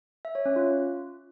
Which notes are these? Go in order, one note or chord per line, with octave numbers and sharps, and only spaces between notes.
E5
C#5
C#4
F4